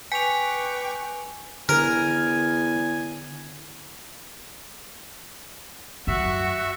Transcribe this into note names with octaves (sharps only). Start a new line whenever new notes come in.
B4 G5 G#5 C#6 D6 B6 F7
E2 D3 A#4 G#5
F#2 F#4 E5